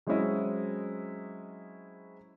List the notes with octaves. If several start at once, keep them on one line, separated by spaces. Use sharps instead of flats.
F#3 G#3 C4 C#4 E4 D#5